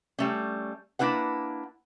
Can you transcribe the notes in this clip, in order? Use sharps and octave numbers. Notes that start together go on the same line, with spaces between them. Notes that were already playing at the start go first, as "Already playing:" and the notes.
G3 A3 C#4
A#3 D4 E4 B4 F#5